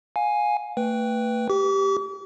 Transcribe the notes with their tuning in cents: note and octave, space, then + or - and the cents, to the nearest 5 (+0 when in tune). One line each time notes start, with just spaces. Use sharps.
F5 +25 G#5 +0
A3 +40 B4 +0 G5 +0
G4 +0 D6 -45